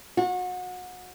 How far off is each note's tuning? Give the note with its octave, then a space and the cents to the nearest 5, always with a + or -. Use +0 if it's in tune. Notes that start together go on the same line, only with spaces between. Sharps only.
F#4 -30